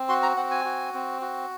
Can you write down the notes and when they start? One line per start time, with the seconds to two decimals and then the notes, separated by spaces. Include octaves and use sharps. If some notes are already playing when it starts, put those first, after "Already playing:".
Already playing: C4
0.09 F#4 C6
0.23 A#5
0.37 C4 F#5
0.51 G#5
0.65 F#4
0.94 C4
1.22 F#4